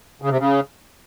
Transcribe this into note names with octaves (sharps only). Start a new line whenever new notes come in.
C#3
C3
C#3